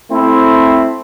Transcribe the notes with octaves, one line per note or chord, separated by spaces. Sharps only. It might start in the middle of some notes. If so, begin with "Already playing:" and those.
A3 C4 E4